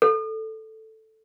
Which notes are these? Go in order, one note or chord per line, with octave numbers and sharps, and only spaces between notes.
A4